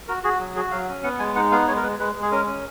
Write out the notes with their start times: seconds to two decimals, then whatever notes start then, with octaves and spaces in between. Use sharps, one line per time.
0.08 F#4 A#4
0.24 F#4 G#4
0.40 F#3
0.56 F#4 G#4
0.71 F#3 F5
0.88 C#4
1.03 B3 F#5
1.19 G#3 G#5
1.36 D#4 F#5
1.51 B3 F5
1.67 G#3 C#5
1.77 A#4
1.83 G#3 B4
1.99 G#3 B4
2.15 G#3
2.22 G#4
2.32 C#4 A#4
2.47 C#4